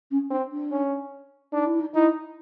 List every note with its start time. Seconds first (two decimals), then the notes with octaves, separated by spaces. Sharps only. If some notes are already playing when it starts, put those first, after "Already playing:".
0.11 C#4
0.30 C4 D4
0.52 D4
0.71 C#4
1.53 D4 D#4
1.66 E4
1.80 D#4
1.94 D#4 E4